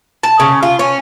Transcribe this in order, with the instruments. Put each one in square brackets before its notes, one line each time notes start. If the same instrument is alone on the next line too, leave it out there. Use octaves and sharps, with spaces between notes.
[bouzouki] A5
C#3
F4
C#4